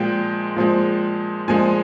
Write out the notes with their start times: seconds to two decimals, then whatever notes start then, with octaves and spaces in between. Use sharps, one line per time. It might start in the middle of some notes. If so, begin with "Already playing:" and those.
Already playing: A#2 F3 G#3 G5
0.56 A#2 F3 G#3
1.48 A#2 F3 G#3 G#5